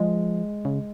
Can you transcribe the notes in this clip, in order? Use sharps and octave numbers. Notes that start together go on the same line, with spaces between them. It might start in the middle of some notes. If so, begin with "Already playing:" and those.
Already playing: F3 G#3
C#3